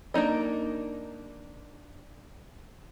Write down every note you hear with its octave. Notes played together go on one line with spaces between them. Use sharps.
A#3 D4 D#4 D#5